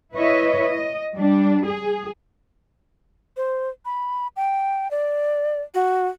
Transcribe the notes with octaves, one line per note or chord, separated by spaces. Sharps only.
E4 B4 C#5 D#5 E5
D#5
G3 D4
G#4
C5
B5
G5
D5
F#4